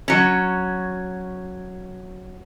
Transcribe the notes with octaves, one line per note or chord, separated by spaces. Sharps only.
F#3 C#4